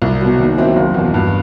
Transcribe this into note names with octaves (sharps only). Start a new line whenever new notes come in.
C2
B2 F#3
D#2
D#3 F#3 C4 E4
F#1
E2 B2
G2